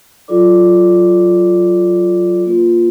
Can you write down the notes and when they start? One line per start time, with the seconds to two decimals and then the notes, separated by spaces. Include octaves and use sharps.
0.28 F#3 F4 G4 A4 D5 D6
2.45 A#3 F4 B4